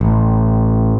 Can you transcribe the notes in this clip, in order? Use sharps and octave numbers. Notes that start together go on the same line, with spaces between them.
A1